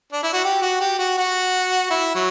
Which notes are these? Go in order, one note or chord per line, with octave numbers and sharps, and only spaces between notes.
D4
E4
F#4
G4
F#4
G4
F#4
F#4
E4
F#3